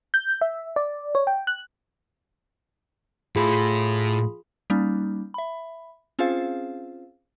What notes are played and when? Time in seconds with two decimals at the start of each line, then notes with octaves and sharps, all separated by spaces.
0.14 G6
0.41 E5
0.76 D5
1.15 C#5
1.27 G5
1.47 F#6
3.36 A2 F4 G#4 A4 B5
4.70 G3 A#3 C#4 D#4
5.34 E5 B5
6.19 C4 C#4 F4 G#4 C5 F5